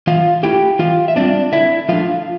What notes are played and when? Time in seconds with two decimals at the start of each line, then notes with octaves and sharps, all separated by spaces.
0.07 E3 F4 F5
0.43 A3 E4 G4 G5
0.79 E3 F4 F5
1.08 E5
1.16 G3 C4 D4 F4 D5
1.52 D3 E4 E5
1.89 F3 A3 D4 F4 F5